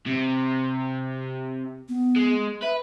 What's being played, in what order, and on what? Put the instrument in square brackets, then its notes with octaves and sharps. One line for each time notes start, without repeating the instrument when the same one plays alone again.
[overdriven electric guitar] C3
[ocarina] B3
[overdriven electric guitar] G#3
[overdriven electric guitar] B4 [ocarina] E5